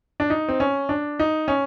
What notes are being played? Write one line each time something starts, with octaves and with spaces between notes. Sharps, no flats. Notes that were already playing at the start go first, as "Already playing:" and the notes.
D4
D#4
C4
C#4
D4
D#4
C#4